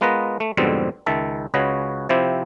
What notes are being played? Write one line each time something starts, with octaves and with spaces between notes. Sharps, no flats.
G#3 B3 F4 A#4 B4 D#5
A3
F2 G#2 B2 D3 G3 C4
C#2 D#3 E5 A5
C#2 C#3 F#4 B4 C#5 D#5
C3 F3 C4 E4 G4